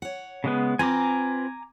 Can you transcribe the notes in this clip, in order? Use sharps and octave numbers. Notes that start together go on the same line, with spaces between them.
C#5 F#5
C#3 G#3 B3
C4 F4 B4 G#5 A#5 D6